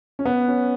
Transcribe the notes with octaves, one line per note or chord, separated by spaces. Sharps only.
C#4
B3
C#4